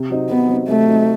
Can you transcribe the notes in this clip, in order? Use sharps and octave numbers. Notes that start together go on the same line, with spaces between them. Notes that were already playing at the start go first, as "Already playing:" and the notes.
Already playing: C3
F#3 C4 D#4
C3 B3
F#3 C4 D#4
C3 A3
F#3 C4 D#4